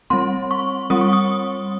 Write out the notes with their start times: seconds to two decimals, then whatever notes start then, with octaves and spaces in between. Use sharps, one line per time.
0.10 G3 C4 C6
0.51 C#6
0.90 G3 C4 D#6
1.01 C#6
1.13 D#6